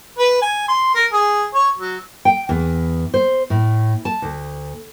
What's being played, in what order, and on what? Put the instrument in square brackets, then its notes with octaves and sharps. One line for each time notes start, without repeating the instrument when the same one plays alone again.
[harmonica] B4
G#5
C6
A#4
G#4
C#5
F#3
[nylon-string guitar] G5
E2
C5
A2
A5
D2